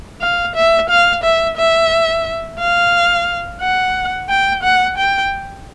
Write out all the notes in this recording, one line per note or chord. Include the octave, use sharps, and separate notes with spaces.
F5
E5
F5
E5
E5
F5
F#5
G5
F#5
G5